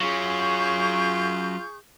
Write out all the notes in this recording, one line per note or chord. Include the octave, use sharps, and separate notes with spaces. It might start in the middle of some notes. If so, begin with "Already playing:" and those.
F#3 C#4 F4 G#4 C#6 G6